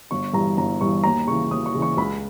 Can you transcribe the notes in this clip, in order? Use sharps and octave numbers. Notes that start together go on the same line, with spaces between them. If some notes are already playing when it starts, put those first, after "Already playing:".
G1 C#6
G2 E3 A#5
G1 A#5
G2 E3 C#6
D#2 A#5
C#3 E3 C#6
D#2 D#6
C#6
C#3 E3
C#6
C#2 B5